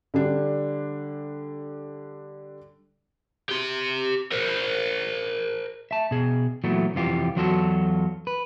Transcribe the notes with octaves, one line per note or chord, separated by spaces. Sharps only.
D3 G3 D4
G4 C6
A#4 C5
E5 A5
B2 G#4
A#2 E3 F#3 A3 B3
C2 F2 E3 F4 G4
E2 F#3 F4 F#4 A4
B4